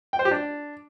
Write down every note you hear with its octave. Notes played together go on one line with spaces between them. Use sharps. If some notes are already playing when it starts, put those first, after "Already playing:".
G5
C5
G4
D4